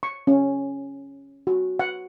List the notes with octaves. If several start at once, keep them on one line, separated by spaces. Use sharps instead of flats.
C#6
C#4
F#4
F#5